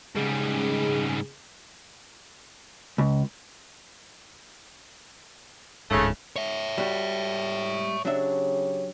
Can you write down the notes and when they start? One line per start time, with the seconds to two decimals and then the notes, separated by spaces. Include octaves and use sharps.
0.16 G#2 C#3 G3 G#4
2.98 C#2
5.91 D1 G#2 C#3 A3
6.36 C#5 E5
6.78 G3 F#4
8.05 C#3 F#3 D4 G4 C#5 E5